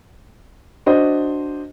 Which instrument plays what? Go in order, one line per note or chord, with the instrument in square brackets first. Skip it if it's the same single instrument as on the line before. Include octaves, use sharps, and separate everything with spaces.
[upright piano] D4 F#4 C5 D#5